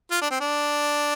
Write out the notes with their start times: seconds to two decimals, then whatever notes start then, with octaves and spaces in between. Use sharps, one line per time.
0.11 F4
0.21 D4
0.30 C4
0.40 D4